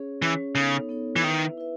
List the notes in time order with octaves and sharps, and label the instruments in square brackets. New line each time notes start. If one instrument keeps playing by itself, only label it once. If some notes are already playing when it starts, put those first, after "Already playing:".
Already playing: [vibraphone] C#4 G#4 C#5
[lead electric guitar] E3 [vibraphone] C#4 G#4 C#5
[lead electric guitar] C#3 [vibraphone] B3 D#4 A4 C#5
[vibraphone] B3 D#4 A4 C#5
[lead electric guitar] E3
[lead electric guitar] D#3 [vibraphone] E4 B4 E5
[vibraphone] E4 B4 E5